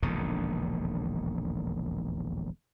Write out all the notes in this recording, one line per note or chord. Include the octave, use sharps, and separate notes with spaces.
E1 A#1 D#2 D3